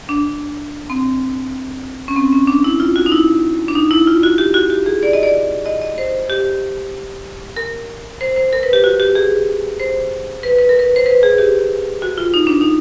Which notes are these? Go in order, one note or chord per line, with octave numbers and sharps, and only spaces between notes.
D4
C4
C#4
C4
C#4
D4
E4
F4
F#4
D#4
E4
D4
D#4
E4
F4
F#4
G4
F#4
G4
G#4
D5
D#5
D5
D#5
D#5
C5
G4
A#4
C5
C5
A#4
B4
G4
F#4
G4
G#4
C5
B4
B4
A#4
B4
C5
B4
G#4
G4
F#4
F4
D#4
D4
D#4